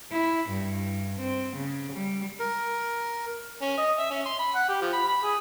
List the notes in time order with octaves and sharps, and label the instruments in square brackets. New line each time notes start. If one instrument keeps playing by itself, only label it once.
[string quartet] E4
G2
C4
C#3
G3
[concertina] A#4
[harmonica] C#4
D#5
E5
C#4
C6
B5
F#5
G4
F3
B5
B5
G#4